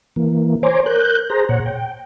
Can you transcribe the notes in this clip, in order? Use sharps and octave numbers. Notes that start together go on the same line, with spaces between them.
E3 A#3
C5 C#5 G#5 A#5 C6 D6
A#4 F#6 G6
G#4 C5 A#5
A#2 C#5 F#5
G5